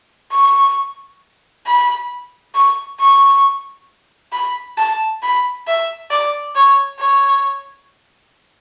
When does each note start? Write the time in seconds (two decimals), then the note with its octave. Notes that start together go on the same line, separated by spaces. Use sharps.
0.32 C#6
1.65 B5
2.55 C#6
3.00 C#6
4.32 B5
4.77 A5
5.22 B5
5.67 E5
6.10 D5
6.55 C#5
6.99 C#5